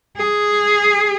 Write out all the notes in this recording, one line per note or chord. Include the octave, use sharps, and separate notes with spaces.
G#4